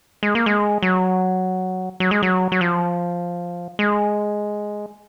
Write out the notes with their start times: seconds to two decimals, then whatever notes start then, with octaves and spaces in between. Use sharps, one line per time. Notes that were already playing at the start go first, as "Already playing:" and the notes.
0.23 G#3
0.35 A#3
0.46 G#3
0.83 F#3
2.00 F#3
2.11 G#3
2.23 F#3
2.52 F#3
2.61 F3
3.79 G#3